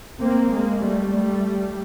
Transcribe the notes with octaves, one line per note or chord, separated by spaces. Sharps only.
A#3 C4
G#3 A#3
G3 A3
G3 A3